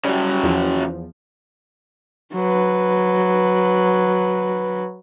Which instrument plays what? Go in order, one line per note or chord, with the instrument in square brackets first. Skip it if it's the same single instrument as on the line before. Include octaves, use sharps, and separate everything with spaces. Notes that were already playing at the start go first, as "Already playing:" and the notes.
[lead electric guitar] C#3 F#3 [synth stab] G3
[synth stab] E2 F3
[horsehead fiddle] F#3 B4